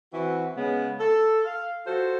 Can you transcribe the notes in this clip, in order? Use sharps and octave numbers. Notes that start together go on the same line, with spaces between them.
E3 C4 F#4
C#3 G#3 B3
A4
F5
F4 F#4 A4 C5